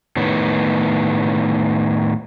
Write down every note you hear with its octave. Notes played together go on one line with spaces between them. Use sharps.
A2 D#3 B3